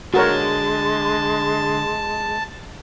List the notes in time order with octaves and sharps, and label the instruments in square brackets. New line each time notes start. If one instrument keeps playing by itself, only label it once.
[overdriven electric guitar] D3 [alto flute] G#3 [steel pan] F#4 A#4 C#5 [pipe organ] A5